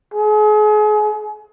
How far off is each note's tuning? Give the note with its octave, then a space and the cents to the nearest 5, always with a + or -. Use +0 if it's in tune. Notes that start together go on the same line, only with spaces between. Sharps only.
G#4 +35